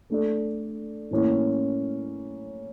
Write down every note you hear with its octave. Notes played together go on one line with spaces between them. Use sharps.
A3 D4 A4 D5
A2 E3 A#3 C#4 E4